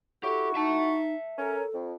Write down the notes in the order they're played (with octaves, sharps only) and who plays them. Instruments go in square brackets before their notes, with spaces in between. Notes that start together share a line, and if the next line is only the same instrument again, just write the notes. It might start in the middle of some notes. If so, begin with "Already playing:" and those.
[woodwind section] E4 F#4 C#6 [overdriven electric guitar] G4 [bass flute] A4
[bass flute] D#4 [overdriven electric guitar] E5 A5
[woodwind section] C#4 A#4 [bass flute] A4
[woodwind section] F2